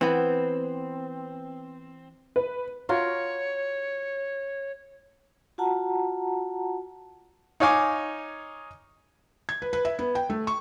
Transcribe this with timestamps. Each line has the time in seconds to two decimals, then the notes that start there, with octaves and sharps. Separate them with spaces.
0.01 E3 B3 C4
2.36 B4
2.89 F4 F#4 A#4 C#5
5.58 F4 F#4 F#5 A5 A#5
7.60 D#4 C#5 F5 G#5 D6
9.49 G#6
9.62 B4
9.73 B4
9.85 E5
9.99 B3
10.15 G5
10.30 A3
10.47 C#6